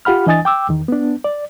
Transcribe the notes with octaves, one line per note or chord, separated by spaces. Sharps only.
F4 G4 F#5 B5 F6
E3 D4 D#5 G#5 D#6 A6
G5 D6 E6
E2 D#3
B3 D4
D5